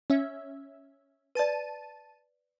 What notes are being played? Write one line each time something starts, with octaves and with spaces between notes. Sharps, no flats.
C#4 E5
B4 D5 A5 D#7